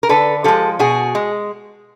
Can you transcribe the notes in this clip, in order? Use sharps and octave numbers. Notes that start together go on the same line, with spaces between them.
A#4
D3 A4 B4
F3 G#3 G4 A4
B2 F#4 G#4
G#3